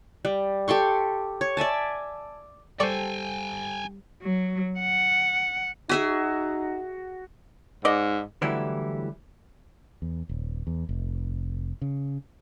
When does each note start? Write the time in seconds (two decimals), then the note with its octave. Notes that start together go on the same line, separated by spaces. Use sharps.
0.25 G3
0.68 G4 A4 C6 C#6
1.41 C#5
1.57 D5 E5 G#5 A5
2.80 G3 A4 C5 D5 G5 G#5 C#6
4.22 F#3
4.79 F#5
5.89 D#4 F#4 G#4 E5 G#5
7.85 G#2 D5 D#5
8.42 D3 E3 F#3 G3 A3 E4
10.02 E2
10.29 D#1
10.67 E2
10.89 F1
11.81 C#3